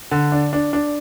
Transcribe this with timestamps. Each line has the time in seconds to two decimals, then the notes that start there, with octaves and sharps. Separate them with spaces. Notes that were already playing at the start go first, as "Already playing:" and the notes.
0.11 D3
0.32 D4
0.53 D4
0.73 D4